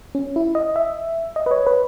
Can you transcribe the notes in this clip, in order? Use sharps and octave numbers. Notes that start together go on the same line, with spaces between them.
C#4
E4
D#5
E5
D#5
B4
C#5
B4